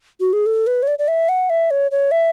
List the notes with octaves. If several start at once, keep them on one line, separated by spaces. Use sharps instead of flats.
F#4
G#4
A4
B4
C#5
D5
D5
E5
F#5
E5
C#5
C#5
E5